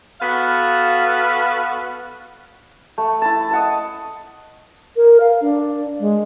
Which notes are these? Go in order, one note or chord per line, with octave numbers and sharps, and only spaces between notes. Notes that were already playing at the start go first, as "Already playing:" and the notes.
B3 F#4 A4 F5
A3
E4 A5
D#5 F#5 A5
A#4
F5
D4
G#3